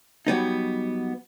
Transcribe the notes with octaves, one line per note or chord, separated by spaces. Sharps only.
F#3 G3 B3 D#4